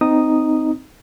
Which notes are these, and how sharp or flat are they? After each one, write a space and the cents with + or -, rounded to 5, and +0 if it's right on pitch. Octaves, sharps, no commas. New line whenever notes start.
C4 -15 D#4 +0 D#6 -5